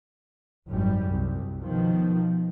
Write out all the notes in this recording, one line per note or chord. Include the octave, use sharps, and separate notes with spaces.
G#1 F#2 G3
C2
B2 D#3 F3